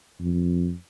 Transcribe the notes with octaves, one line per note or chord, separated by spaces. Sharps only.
F2